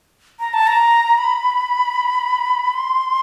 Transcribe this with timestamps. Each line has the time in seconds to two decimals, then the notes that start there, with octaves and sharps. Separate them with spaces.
0.40 A#5
0.53 A5
0.67 A#5
1.18 B5
2.73 C6